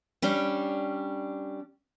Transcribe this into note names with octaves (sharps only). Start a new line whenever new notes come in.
G3 C#4 D4